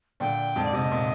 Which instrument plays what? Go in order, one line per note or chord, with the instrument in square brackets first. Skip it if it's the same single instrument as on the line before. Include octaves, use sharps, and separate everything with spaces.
[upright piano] A#2 D3 [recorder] G5
[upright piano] F2 G#2
[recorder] D5
[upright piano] G#2 C3 [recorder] D#5
[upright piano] A#2